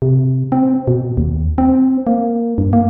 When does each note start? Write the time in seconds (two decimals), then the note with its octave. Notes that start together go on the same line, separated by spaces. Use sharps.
0.02 C3
0.52 C4
0.88 B2
1.17 D#2
1.58 C4
2.07 A#3
2.58 G2
2.73 A#3